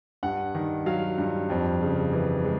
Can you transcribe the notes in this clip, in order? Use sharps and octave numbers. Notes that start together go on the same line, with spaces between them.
G2 F#5
D#3
F#3 F5
G2
F2
C#3
E3
G#3